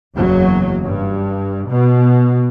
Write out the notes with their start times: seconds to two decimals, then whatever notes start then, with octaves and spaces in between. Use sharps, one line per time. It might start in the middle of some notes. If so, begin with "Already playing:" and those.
0.16 F#1 E2 C#3 F#3
0.83 G2
1.68 B2